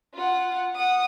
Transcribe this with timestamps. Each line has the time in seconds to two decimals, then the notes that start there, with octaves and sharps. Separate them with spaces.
0.14 F4 F#5
0.75 F#5 D#6